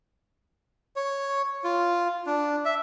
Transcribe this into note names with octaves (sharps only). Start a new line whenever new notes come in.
C#5
F4
D4
E5